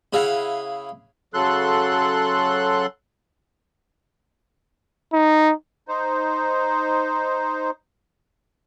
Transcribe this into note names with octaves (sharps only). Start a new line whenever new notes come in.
C#3 E4 G#4 F5 F#5
C#3 F#3 A4 C6 F#6
D#4
D#4 C5